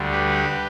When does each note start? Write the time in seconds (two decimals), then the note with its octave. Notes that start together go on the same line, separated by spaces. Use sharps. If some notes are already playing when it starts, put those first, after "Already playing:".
Already playing: D2 D3 G3
0.11 G4 B4